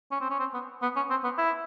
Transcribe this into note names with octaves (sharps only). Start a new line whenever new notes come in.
C#4
C4
C#4
C4
B3
B3
C#4
C4
B3
E4